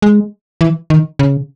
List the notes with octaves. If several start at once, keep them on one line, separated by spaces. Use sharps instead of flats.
G#3
E3
D#3
C#3